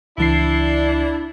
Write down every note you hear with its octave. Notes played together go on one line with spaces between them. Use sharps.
C#2 E3 D4 E4 C7